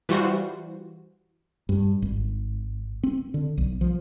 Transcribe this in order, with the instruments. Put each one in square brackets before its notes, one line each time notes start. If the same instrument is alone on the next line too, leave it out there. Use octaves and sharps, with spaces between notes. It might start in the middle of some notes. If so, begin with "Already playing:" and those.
[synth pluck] E3 G3 F4 F#4 C5
[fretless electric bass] G2
G#1
C4
D3
B1
F3